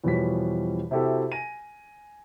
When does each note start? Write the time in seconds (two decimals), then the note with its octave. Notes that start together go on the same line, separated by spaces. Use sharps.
0.04 E2 B2 F3 G3 C#5 B6
0.91 C3 E4 F#4 G4 A4
1.32 G#5 A#6 D#7